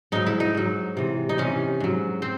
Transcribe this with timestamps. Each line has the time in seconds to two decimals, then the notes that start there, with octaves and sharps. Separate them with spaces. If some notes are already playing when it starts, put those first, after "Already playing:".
0.12 G#2 F#3 D#4
0.27 E4
0.40 D#4
0.55 G#2 F#3
0.97 C3 E3
1.29 D#4
1.38 C3 E3 C#4
1.80 G#2 F#3
2.22 C4